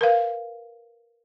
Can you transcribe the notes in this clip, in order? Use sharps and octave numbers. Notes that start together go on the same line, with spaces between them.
A#4 B4 F5